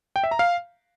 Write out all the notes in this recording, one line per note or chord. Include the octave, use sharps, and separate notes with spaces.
G5
E5
A#5
F5